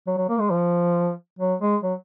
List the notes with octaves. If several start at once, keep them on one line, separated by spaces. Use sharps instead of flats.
F#3
F#3
A#3
G#3
F3
F#3
G#3
F#3